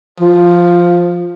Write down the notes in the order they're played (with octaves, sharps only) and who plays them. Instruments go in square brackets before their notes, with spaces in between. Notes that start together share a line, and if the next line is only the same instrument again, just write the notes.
[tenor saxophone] F3